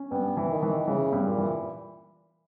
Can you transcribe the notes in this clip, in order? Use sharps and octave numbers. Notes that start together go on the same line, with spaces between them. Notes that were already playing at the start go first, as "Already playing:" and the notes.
Already playing: C#4
G2 B3
E3
D#3
E3
C#3 E3
G2
A#2
E3